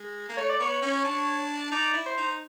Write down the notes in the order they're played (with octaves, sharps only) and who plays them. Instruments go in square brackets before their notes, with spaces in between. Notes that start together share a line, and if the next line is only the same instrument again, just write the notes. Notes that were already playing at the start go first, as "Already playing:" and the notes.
Already playing: [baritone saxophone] G#3
A#3
[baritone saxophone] A3 [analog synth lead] C#5
[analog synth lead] D5
[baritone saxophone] B3 [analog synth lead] C#5
[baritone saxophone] C#4
D4
[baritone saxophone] D#4 [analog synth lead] D5
[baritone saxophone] E4
[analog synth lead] C5
[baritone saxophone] D#4